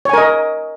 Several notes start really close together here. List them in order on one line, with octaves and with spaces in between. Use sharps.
C#5 G#5 A#4 D#5